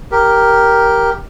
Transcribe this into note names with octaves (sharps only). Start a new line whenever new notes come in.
G4 A#4